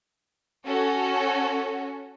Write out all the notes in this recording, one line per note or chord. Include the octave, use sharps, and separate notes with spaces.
C#4 F#4 A4